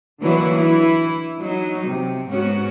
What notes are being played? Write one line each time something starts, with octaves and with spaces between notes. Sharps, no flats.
D3 E3 F#3 A#3 E4
E3 E4
F#3 D#4
C3
G#2 B3 C#4 F#4